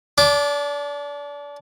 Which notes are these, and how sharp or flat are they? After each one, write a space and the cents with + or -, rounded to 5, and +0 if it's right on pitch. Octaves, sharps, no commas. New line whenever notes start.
D4 -30 D6 +0